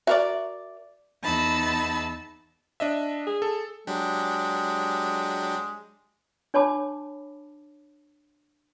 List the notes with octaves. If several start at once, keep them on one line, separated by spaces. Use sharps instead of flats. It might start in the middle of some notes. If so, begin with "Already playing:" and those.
F#4 A#4 D5 E5
E2 D#4 A5 B5 E6
D4 D#5 E5
G#4
A4
F#3 G#3 D4 G4
D4 C#5 A5 B5 D6